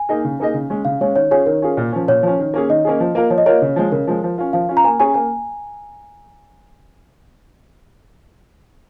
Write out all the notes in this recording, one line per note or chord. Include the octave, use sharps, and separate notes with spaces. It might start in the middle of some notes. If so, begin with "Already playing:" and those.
Already playing: G#5
A#3 D#4 G#4 D#5
C#3
A#3 D#4 G#4 D#5
C#3
G#3 C#4
C#3 F5
G#3 C#4 C#5
D#3 C#5
C#4 F4 G#4 C#5
D#3 A#4
C#4 F4 G#4
A#2
F3 C#4
A#2 C#5
F3 C#4
D#3
A#3 C#4 G#4
D#3 D#5
A#3 C#4 G#4
F3
A#3 F4 A#4
F3 C#5
D#5
A#3 F4 A#4 C#5
C#3
F3 G#3
C#3 A#4
F3 G#3
F3
C#4 F4
F3 F5
C#4 F4
A#5
A#3 G#5
C#4 G#4 C#5 G#5
A#3 G#5